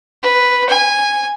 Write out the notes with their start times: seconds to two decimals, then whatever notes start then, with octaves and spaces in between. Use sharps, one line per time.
0.23 B4
0.69 G#5